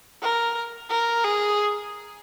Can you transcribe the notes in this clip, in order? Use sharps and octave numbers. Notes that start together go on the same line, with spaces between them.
A#4
A#4
G#4